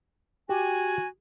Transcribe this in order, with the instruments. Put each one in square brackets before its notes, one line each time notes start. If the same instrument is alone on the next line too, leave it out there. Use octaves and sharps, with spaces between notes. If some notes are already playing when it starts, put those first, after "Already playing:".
[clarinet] F#4 [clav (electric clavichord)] G4 [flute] G#5